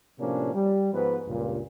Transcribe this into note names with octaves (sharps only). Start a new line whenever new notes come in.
A2 C3 F3 A#3 C#4 D4
G3
G#2 F3 B3 B4
C#2 G2 A#2